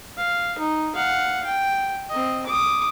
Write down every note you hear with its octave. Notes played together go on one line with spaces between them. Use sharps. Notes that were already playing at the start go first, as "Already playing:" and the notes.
F5
D#4
F5 F#5
G5
C4 D#5
D6 D#6